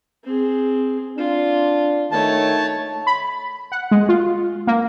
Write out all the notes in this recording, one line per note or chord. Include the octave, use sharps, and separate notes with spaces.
C4 G#4
D4 F4
D#3 A3 C#5 A5
B5
F#5
G#3
F4
A#3